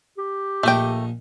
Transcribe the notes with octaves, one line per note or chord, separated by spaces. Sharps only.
G4
A#1 A3 D#5 G5